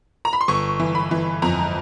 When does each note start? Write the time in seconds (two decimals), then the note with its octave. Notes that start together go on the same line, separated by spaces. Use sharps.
0.25 A#5
0.33 B5
0.41 C6
0.48 G1 C#6
0.80 E3
0.95 B5
1.11 E3
1.42 F2 A#5